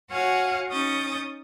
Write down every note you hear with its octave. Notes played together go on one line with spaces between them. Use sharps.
F#4 C#5 F5 F#5 G#5
C#4 D#4 C#6 D#6 G6 A6